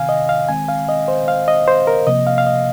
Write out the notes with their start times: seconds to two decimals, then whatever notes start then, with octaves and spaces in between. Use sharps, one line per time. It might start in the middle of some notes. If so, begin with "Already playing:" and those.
Already playing: C3 D#3 C4 F5 G#5
0.09 D#5
0.29 F5
0.48 D#3 G#3 C4 G#5
0.69 F5
0.89 D#5
1.08 C5
1.28 F5
1.48 D#5
1.68 C5
1.87 A#4
2.07 C3 F3 A#3 D#5
2.27 F5
2.38 F5
2.46 D#5